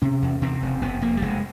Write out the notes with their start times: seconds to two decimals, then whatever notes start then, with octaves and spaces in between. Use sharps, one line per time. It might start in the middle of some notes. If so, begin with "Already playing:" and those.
0.02 C3 C#4
0.22 E2
0.42 C3 C4
0.62 F1
0.81 F1 B3
1.02 F1 A#3
1.17 G3
1.22 F1 G#3